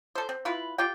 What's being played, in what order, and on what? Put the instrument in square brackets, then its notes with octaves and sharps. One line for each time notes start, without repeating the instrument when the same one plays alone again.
[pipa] A4 C5
C4
E4 F4 B4
F4 G4 G5